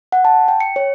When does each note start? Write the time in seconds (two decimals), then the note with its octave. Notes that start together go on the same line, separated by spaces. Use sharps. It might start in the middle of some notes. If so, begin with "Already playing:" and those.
0.12 F#5
0.25 A5
0.48 G5
0.60 C#7
0.76 C#5